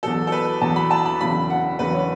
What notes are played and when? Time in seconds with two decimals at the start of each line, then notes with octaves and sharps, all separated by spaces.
0.03 E2 B2 F#3 A4
0.27 A4
0.32 B4
0.61 E2 B2 F#3 A5
0.76 B5
0.91 A5
1.06 B5
1.21 E1 E2 C#3 F#3 B5
1.50 F#5
1.79 E1 E2 C#3 F#3 B4
1.94 C#5